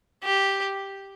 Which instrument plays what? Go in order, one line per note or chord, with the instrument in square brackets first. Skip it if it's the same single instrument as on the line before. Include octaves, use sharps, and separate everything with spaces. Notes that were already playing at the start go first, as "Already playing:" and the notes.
[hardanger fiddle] G4